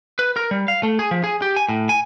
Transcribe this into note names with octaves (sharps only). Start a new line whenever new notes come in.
B4
A#4
G3
F5
A3
G#4
F3
G#4
G4
G#5
A2
G#5